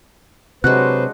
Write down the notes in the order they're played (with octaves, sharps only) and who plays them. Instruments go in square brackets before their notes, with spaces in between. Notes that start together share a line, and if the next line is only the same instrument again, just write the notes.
[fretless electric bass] C3 [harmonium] F#3 B4 C5 [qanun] G#3 D4 F#4 [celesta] F#6